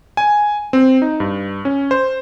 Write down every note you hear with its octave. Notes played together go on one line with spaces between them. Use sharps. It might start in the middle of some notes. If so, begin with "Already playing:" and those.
G#5
C4
D#4
G2
C#4
C5